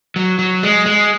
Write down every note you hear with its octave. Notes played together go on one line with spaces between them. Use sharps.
F#3
F#3
G#3
G#3